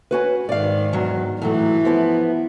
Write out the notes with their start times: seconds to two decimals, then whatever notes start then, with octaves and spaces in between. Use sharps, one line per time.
0.11 C#4 F#4 B4
0.49 G#2 D#3 D5 F5
0.93 E2 G2 F#3
1.42 A2 E3 F#3 A3
1.85 F3 B3 E4